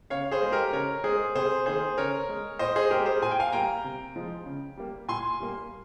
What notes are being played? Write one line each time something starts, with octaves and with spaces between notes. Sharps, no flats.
C#3 C#5 F5
G#4 C5
G#3
G4 A#4
C#3 A#4 C#5
G#3 G#4 C5
C3 G#4 C5
D#3 A#3 G#4 C5
C#3 A#4 C#5
G#3
A#2 C5 D#5
G#4 C5
G#3 G4 A#4
G#4 C5
A#2 G#5
G5
F5 G#5
G3 A#3 G5 A#5
C3
F3 G#3
C#3
G3 A#3
A#2 G#5 C6
G3 A#3